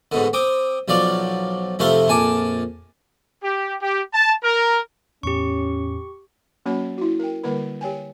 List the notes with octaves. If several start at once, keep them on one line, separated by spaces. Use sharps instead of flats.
G#2 B2 D3
C4 D6 D#6
B1 F3 F#3 D5 F5
F2 C3 A3 E4 F5 C6
A#1 F2 G#5 A5 D6
G4
G4
A5
A#4
E2 A2 C#4 G4 C#6
F#3 A#3 C#4 F#4 C#5 B5
E4 F#4
A#4 G5
D3 G3 A#3 A#4 B4 B5
G4 C#5 G5 G#5